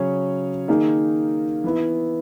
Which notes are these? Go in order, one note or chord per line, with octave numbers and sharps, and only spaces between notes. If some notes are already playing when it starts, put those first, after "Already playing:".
Already playing: C#3 F#3 C#4 G#4 C#5
D#3 A#3 D#4 G#4
E3 B3 E4